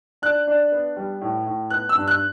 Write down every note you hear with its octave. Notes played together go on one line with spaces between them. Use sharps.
D4 F#6
D4
B3
G3
A2
A2
B3 F#6
E6
G2
F#6